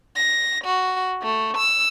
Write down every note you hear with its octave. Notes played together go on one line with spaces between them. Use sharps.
A#6
F#4
A3
E6